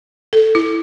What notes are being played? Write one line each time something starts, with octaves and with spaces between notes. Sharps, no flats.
A4
E4